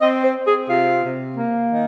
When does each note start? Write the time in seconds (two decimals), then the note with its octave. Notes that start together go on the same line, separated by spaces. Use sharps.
0.01 C4 D#5
0.24 C5
0.36 C4
0.47 G#4
0.69 C3 F4
1.04 C3
1.37 A#3
1.70 D#3